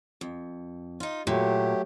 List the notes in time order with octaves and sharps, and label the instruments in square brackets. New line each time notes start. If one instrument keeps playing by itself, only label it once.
[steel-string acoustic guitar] F2
D#4 F4
[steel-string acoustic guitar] A#2 [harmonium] F#3 A3 G4